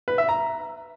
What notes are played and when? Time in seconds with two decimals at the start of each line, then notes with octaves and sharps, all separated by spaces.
0.08 B4
0.18 E5
0.29 A#5